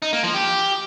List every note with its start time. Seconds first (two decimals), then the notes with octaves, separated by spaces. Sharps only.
0.02 D#4
0.13 A#3
0.23 F3
0.34 G4